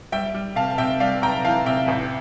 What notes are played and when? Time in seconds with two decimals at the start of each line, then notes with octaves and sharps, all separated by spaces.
0.12 G3 E5 G5
0.34 G3
0.56 C3 F5 A5
0.71 A5
0.78 C3 E5 G5
1.00 G3 D5 F5
1.22 C3 G5 A#5
1.45 E3 F5 A5
1.66 C3 E5 G5
1.88 A1